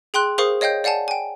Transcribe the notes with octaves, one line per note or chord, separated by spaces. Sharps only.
G#4 G5 C6 F#6
G#4 A#4 C5 F5 C#6 D#6
C#5 D#5 F5 G5 G6
D5 F5 F#5 G#5 A5
G5 G#5